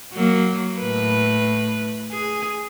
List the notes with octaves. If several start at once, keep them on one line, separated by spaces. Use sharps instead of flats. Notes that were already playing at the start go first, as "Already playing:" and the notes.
F#3 A#3
A2 B4
G#4